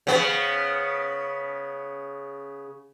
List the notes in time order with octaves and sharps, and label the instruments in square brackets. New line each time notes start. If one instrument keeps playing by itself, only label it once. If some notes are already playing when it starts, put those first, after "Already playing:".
[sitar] C#3 B3